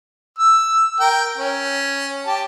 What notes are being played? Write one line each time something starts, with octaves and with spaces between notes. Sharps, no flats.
E6
A#4 G5
C#4
G4 A5